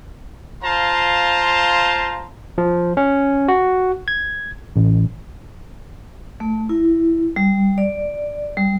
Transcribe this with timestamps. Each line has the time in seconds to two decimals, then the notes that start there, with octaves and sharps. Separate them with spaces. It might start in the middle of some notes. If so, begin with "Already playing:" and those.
0.64 F4 C5 F5 A5 A#5 C6
2.58 F3
2.97 C#4
3.48 F#4
4.08 G#6
4.76 A1
6.40 A3
6.69 E4
7.36 G3
7.78 D5
8.57 G3